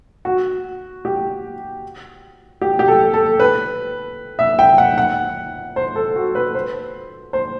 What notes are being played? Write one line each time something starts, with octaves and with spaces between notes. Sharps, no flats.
F#4
G4
G4
G4
A4
A4
B4
E5
G5
F#5
F#5
C5
A4
F#4
B4
C5
C5